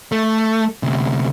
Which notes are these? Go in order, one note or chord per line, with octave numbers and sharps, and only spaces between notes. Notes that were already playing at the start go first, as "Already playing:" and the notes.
A3
D2 C3